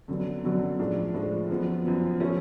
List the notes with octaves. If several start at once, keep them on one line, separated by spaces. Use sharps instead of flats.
F#2 D3 F#3 B3
F#2 D3 F#3 B3
A2 F3 G#3 D4
A2 F3 G#3 D4
F#2 F3 B3
F#2 F3 B3
F3 A3 C#4